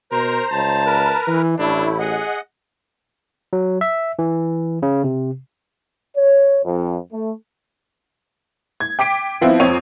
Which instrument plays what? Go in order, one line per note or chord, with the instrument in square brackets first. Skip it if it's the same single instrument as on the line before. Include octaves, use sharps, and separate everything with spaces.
[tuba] B2 [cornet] A#4 [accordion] C5 A#5
[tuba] C#2 [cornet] A5
[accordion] A#4 B4 A#5
[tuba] E3
[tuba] A1 [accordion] A3 E4 [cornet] D4
[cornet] G#4 [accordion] D#5 F#5
[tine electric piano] F#3
E5
E3
C#3
C3
[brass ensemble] C#5
F2
A3
[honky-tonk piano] G#6
G5 D6 B6 D7
F3 B3 C4 E4 F4
F2 C4 C#5 D#7 F7